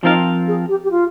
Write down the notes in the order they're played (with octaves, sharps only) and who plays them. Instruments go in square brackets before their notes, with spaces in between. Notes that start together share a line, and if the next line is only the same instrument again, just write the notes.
[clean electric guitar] F3 C4 F4 A#4 F5 [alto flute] D#4
[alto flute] G#4
G4
G4
F4